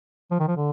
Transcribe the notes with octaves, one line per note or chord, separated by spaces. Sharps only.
F3
D#3
F3
D3